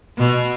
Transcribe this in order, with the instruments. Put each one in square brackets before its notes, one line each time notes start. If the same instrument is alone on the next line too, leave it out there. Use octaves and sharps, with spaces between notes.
[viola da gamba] B2